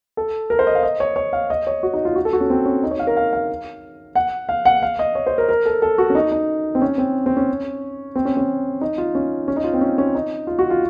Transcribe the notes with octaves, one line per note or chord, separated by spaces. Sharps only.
A4
A#4
C5
D#5
F5
D#5
C#5
C#5
F5
D#5
C#5
F#4
D#4
F4
F#4
A4
F#4
C#4
C4
C#4
D#4
C#5
F5
A#4
F5
F5
F#5
F5
F#5
F5
D#5
C#5
C5
A#4
A#4
A4
A4
F#4
C#4
D#4
D#4
C4
C#4
C4
C4
C#4
C4
C#4
C#4
D#4
F4
C#4
C#4
D#4
F4
C4
C#4
C#4
D#4
F4
F#4
F4